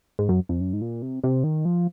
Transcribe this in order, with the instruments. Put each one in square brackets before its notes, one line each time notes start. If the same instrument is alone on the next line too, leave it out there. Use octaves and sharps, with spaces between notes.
[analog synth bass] G#2
F#2
F2
F#2
G#2
A#2
C3
C3
D#3
F3